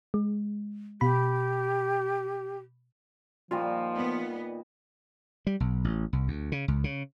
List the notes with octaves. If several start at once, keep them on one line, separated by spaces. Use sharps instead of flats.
G#3
B2 G4 B5
A#2 D#3 F3 G3 F4
B3
G3
B1
A1
C2
D2
C#3
C#2
C#3